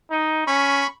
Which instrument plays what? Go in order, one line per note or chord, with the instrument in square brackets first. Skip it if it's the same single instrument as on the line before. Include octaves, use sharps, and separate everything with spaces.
[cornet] D#4
[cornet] C#4 [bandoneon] B5 C#6